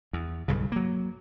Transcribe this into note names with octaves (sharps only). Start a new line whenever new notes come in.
E2
B1 G2 C#3
F#3 A#3